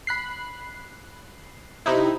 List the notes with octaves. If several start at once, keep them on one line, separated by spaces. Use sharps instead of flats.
B5 F#6 C7
C3 D#4 E4